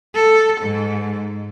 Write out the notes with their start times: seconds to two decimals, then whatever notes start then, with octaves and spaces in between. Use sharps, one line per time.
0.15 A4
0.61 G#2